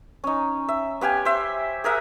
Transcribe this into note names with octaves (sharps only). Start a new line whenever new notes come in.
C#4 D#4
E5
B3 G4 F5 G#5
C5 E5
G#4 A#4 E5 F#5